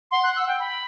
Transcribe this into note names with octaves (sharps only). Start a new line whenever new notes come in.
F#5 C6
F#6
E6
G5
B5